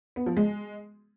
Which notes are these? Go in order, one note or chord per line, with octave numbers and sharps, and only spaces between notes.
B3
F3
G#3